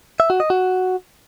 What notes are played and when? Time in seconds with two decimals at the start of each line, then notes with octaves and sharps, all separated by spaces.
0.20 E5
0.30 F#4
0.40 D#5
0.50 F#4